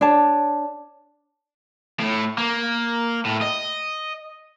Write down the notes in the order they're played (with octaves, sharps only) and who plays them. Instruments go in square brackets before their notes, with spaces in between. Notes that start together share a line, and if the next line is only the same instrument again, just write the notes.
[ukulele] D4 C#5 A5
[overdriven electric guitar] A2
A#3
A2
D#5